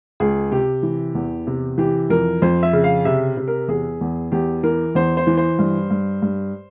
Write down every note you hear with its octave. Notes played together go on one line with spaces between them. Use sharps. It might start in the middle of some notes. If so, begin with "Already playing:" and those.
C#2 G#4
C3 G4
E3
E2
C3
E3 G4
F2 A#4
F2 C5
E5
C#3
F5
C3 E5
C3
A#4
E2 G#4
E2
E2 G4
E3 A#4
E2 C5
C5
E3
C5
G2
G2
G2